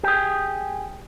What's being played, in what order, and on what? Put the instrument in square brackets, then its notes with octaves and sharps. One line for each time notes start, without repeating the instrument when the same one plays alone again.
[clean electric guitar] G4 G#4